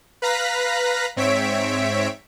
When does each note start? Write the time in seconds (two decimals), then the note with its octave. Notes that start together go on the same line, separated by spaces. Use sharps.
0.22 B4 F5 A#5 F#6 A#6 B6
1.16 G#2 C4 C#5 E5 B6 D7